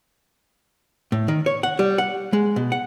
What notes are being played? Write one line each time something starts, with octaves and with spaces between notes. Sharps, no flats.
A2
D#3
C#5
F#5
G3
F#5
G#3
B2
F#5